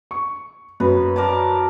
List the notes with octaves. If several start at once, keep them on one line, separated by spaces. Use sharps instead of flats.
C#6
F#2 B4
A#4 D5 A5